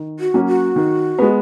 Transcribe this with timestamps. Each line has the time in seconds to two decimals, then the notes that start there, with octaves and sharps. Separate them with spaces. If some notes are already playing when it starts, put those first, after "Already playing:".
Already playing: D#3
0.20 F#4
0.34 F#3 A#3 C#4
0.48 F#4
0.76 D#3
1.19 G#3 B3